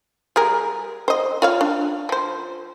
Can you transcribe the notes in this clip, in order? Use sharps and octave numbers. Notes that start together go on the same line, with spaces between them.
G3 G#4 A#4
C5 D#5
F4 C#5 F5
D4
F3 C5